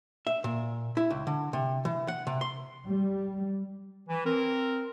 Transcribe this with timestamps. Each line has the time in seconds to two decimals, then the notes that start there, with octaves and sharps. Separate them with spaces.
0.27 E5
0.44 A#2
0.97 E4
1.11 C#2
1.27 D3
1.53 C3
1.85 E3
2.08 F#5
2.27 C3
2.41 C6
2.86 G3
4.08 E3
4.26 C4 A#4